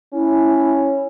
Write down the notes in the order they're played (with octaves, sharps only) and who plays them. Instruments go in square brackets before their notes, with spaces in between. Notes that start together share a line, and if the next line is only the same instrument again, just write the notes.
[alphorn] C#4 [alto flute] E4